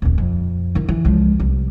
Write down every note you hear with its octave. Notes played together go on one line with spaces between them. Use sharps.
D#1 D2
F2
D#3 E4
E3
C#2 F3
C2